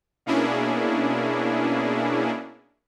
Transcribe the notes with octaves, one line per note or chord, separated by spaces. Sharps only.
B2 A#3 C#4 D4 E4 G#4